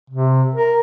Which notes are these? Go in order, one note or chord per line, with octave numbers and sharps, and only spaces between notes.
C3
A#4